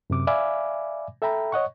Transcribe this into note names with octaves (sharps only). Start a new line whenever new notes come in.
F#2 C3 D6
D5 E5 F5 G#5 B5 D6
A4 E5 G5 A#5 B5
C#5 D#5 F#5 C#6